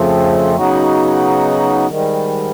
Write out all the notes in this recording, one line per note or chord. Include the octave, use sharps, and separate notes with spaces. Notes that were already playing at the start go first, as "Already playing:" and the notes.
Already playing: F2 C#3 F3 A3 C4
C#3 F#3 B3 D#4 F#4
G#2 D#3 G3